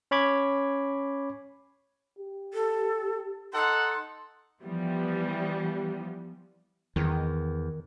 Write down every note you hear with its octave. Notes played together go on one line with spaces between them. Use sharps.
C#4 C#5 B5 D6 G#6
G4
A4
D#4 A4 F#5 C6
E3 F3 G3 B3
E2 D#3